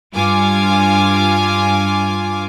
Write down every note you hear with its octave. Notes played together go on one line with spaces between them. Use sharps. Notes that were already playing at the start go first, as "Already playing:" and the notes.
G2 F4 G#5 D6